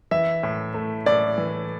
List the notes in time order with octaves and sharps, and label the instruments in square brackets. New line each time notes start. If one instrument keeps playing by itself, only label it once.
[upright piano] E3 E5
A2
A3
A2 D5
E3